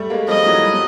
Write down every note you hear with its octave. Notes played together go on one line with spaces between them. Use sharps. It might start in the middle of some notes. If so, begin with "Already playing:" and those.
Already playing: G3 A3
G#3 A#3
F3 G3 D#5
E3 F#3
G3
F#3